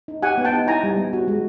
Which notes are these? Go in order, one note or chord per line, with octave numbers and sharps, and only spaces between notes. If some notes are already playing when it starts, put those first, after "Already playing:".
D#4
G4 F#5 G#5
B3
G5 A5
D#4
E4 G#5 A#5
G3
B3
F#4
G#3